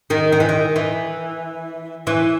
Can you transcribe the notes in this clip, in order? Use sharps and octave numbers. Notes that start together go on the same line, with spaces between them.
D#3
D#3
E3
D#3
E3
E3